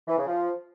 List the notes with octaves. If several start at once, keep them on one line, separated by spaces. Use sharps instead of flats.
E3
C#3
F3